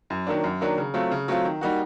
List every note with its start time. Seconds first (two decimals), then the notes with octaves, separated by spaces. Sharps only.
0.10 F#2
0.27 D#3 F#3 A#3 D4
0.44 F#2
0.61 D#3 F#3 A#3 D4
0.78 C#3
0.94 F#3 A3 C4 F4
1.11 C#3
1.28 F#3 A3 C4 F4
1.45 D#3
1.61 G3 A#3 D#4 F#4